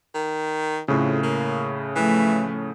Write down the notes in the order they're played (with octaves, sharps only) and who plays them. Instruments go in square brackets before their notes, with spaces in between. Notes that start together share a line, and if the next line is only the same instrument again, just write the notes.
[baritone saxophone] D#3
[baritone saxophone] F2 [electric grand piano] A2 C#3
[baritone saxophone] A#3
[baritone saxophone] E3 [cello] F3 A3